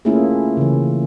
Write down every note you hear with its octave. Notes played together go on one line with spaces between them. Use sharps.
A3 A#3 C#4 E4 F4 G#4
C#3 E3